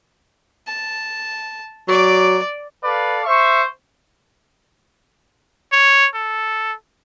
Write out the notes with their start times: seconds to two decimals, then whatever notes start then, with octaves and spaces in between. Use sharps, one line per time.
0.67 A5
1.88 F#3 D5 D6
2.84 A4 B4 D5 F5
3.25 C5 E5 C#6
5.72 C#5
6.14 A4